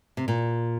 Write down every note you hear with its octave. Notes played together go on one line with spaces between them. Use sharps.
C3
A#2